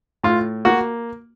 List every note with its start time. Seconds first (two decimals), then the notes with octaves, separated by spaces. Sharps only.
0.23 A2 F4
0.65 A#3 F#4